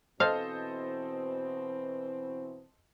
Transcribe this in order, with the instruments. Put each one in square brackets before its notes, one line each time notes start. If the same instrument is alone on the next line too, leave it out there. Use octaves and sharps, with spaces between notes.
[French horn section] B2 E3 C4 [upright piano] A4 C5 D#5 [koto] F5